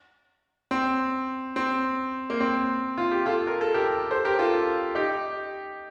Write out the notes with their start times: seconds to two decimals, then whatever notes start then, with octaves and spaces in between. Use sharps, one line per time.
0.71 C4
1.56 C4
2.30 A#3
2.41 C4
2.98 F4
3.11 G4
3.26 F4 A4
3.47 A#4
3.61 A4
3.74 G4 A#4
4.11 A4 C5
4.25 G4 A#4
4.39 F4 A4
4.95 D#4 G4